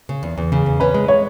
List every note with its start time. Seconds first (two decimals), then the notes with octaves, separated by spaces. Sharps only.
0.09 C#3
0.23 E2
0.38 E2
0.52 C#3
0.66 E2
0.80 C#4 B4
0.94 G#3
1.08 G#3 C#5